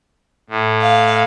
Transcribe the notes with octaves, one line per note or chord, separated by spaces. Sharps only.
A2
F5